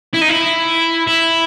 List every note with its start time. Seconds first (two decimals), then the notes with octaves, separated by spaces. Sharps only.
0.14 E4
0.21 D#4
0.29 E4
1.07 E4